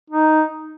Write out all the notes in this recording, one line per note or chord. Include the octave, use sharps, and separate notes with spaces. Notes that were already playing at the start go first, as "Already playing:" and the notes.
D#4